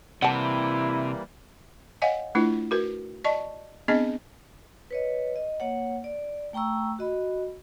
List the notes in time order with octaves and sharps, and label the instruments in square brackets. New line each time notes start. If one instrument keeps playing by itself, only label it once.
[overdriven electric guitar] C3 [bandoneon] E3 G3 A#3 [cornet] E4 [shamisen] F#5 A5
[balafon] C#5 D#5 F5 F#5 G#5
A3 D4 E4 F4 B4
F#4 A#4 B4
D5 D#5 A5 C#6
B3 C4 D4 G#4 D#5
[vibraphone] B4 C#5 D#5
D#5
A#3 C#5 F#5
D5
A3 G5 A#5 C#6 E6
F#4 D#5 B5